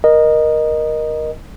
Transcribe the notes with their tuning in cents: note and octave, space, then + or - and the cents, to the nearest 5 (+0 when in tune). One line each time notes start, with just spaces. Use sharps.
A#4 +15 D#5 -15